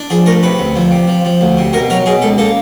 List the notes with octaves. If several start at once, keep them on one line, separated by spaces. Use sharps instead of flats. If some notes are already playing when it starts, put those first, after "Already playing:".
Already playing: D4
F3 G#4
A3 A#4
C3 B4
D2
F3
C3
F3
F3
D2
C3
B2 A#4
F#3 A#4
B2 G#4
C#2 A4
A#3 A4